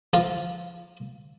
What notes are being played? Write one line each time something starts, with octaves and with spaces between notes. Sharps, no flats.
F3 F4